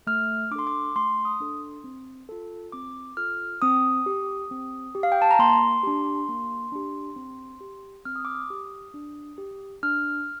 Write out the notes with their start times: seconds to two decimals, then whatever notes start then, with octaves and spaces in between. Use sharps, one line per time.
0.07 A3 F6
0.51 D4 D6
0.56 A4 C6
0.67 D6
0.95 A3 C6
1.25 D#6
1.40 D4 A4
1.84 C4
2.29 F4 A4
2.72 C4 D6
3.17 F4 A4 F6
3.62 C4 D#6
4.06 G4
4.51 C4
4.95 G4
5.03 F5
5.12 G5
5.22 A5
5.31 A#5
5.39 A#3 C6
5.83 D4 G4
6.28 A#3
6.72 D4 G4
7.16 C4
7.61 G4
8.05 C4 F6
8.16 D#6
8.25 D6
8.35 D#6
8.50 G4
8.94 D4
9.38 G4
9.83 D4 F6